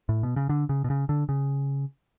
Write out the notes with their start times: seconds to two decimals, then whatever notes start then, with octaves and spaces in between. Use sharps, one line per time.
0.09 A2
0.23 B2
0.36 C#3
0.49 D3
0.69 C#3
0.84 B2
0.90 C#3
1.09 D3
1.29 C#3